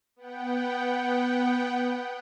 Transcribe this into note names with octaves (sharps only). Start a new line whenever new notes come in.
B3 F#5 G5